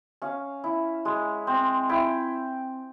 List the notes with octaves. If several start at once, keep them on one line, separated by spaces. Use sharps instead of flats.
C#4 F5
E4
G#3
C4
E4 G5